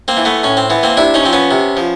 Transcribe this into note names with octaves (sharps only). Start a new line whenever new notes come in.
A#3 C4
E3
A3 B3
A2 C#4
C4
E3 B3
A#3 C4
C3 D4 E4
C#4 D#4
F3 C4
B3 C#4
C3
F3